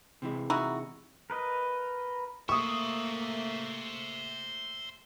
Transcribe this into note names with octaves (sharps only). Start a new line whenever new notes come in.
C3 E3 G#3
D#4 E4 F#4
A#4 B4 D#5
A3 A#3 C5 E5 C#6 D#6